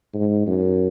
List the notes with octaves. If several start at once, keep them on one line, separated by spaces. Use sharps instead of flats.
G#2
F#2